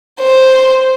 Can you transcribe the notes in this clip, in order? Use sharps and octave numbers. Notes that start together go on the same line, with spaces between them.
C5